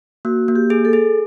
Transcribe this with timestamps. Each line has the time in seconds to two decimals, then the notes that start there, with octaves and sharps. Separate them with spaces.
0.25 A#3 F#4
0.48 A#3
0.55 G4
0.70 G#4
0.85 A4
0.93 G#4